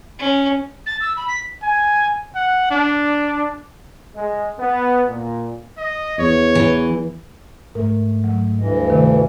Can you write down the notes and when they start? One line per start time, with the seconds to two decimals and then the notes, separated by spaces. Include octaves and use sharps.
0.19 C#4
0.86 A6
1.01 E6
1.17 B5
1.28 B6
1.62 G#5
2.35 F#5
2.70 D4
4.15 G#3
4.59 B3
5.07 A#2
5.78 D#5
6.19 E2 C#5
6.55 E3
7.75 G#2 A3 A#4
8.24 F#3
8.59 D2 G2 E3 D#5
8.90 C3 D#3 A3